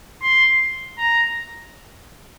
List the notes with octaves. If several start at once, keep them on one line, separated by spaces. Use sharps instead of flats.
C6
A#5